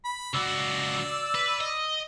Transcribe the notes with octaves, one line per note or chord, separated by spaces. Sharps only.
B5
C#2 F#4 D5 E6
B4
D#5